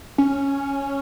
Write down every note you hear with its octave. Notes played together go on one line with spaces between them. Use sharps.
C#4